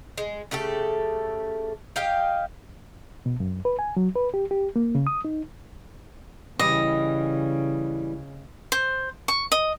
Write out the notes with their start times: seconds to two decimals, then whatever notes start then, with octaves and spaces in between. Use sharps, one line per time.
0.18 G#3
0.51 C#3 A3 G4 A4
1.96 G4 D#5 F5 G5
3.26 B2
3.40 F#2
3.65 B4
3.79 G#5
3.97 F#3
4.16 B4
4.34 G4
4.51 G4
4.76 A#3
4.95 C#3
5.07 D#6
5.25 D#4
6.59 C#3 E3 G3 D#5
8.72 C5
9.28 C#6
9.52 D#5